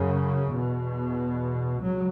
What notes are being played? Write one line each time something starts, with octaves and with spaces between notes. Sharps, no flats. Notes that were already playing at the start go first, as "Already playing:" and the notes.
Already playing: F#2 C#3
E2 B2
C#2 F#3